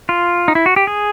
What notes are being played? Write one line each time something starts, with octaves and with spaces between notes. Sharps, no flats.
F4
D#4
E4
F#4
G4
G#4